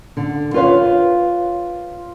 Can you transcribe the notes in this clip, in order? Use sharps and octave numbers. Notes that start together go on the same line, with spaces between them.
D3
F4 B4 C#5 F5